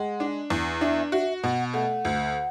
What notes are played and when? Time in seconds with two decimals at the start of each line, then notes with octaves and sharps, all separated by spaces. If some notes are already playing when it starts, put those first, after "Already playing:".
Already playing: G#3 F#5
0.20 D4
0.50 E2
0.81 D4 E5
1.12 F#4 E5
1.43 B2 F#5
1.74 A3 F#5
2.05 D2